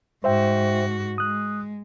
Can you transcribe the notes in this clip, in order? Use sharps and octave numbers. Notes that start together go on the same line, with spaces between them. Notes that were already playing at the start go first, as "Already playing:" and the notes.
G#2 F#4 C5 E5 G5
G#3 D#6 F#6